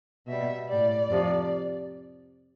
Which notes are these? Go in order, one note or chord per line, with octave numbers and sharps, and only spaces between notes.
B2 G3 E5
A2 G3 D5
F2 C3 F3